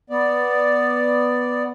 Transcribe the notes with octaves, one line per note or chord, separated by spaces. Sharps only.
B3 D5